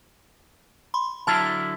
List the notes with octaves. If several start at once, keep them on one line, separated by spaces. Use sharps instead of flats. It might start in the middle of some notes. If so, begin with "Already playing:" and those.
B5 C6
D3 F#3 E4 A5 F6 A6